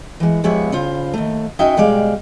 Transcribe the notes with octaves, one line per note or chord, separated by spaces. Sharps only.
E3 G#3
F3 G#3 B3 G4 C#5 E5
C#3 F4 C5
D#2 A3
C#4 D#4 F#4 D#5 E5 G5
B2 G3 G#3 D5 F5